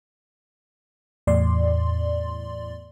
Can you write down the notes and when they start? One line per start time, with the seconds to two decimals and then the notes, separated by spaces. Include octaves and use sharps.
1.27 E2 A2 D5 C6